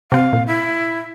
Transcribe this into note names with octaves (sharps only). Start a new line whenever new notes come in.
C3 C4 F5
A#2
E4